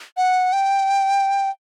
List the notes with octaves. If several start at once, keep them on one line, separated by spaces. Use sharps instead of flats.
F#5
G5